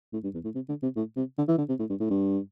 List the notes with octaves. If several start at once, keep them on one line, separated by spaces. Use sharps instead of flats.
A2
G2
E2
A2
C3
D3
C3
A2
C3
D3
E3
D3
C3
A2
G2
A2
G2